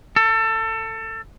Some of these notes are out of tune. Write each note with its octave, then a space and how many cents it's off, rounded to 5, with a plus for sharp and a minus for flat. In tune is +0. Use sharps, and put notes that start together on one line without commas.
A4 +25